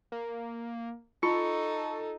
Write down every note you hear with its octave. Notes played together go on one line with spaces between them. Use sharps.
A#3
D#4 F4 A4 C#6